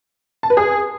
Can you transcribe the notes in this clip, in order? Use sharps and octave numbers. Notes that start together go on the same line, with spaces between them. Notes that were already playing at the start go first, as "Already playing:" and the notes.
A5
B4
G#4